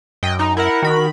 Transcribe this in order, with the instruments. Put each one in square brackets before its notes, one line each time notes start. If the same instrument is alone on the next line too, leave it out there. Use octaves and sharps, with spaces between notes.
[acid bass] F#2 [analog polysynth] D#5 G5
[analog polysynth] D#4 [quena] A#5
[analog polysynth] E4 F#5 [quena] A#4
[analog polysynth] D#3 B5 [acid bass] F#4